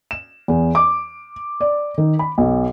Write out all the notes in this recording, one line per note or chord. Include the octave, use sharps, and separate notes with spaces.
E7
E2
D6
D5
D#3
B5
B1